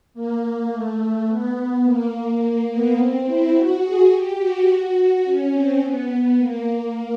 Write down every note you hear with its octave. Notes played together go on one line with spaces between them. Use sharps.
A#3
A3
B3
B3
A#3
B3
C4
E4
F#4
G#4
G4
F#4
C#4
C4
B3
A#3